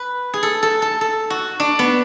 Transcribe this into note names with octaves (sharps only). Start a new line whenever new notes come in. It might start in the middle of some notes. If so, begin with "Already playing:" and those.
Already playing: B4
G#4
A4
A4
A4
A4
F#4
D4
B3